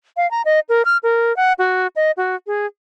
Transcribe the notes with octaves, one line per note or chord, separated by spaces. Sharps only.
F5
A#5
D#5
A#4
F6
A#4
F#5
F#4
D#5
F#4
G#4